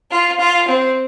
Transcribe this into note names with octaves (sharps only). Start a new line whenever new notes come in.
F4
F4
C4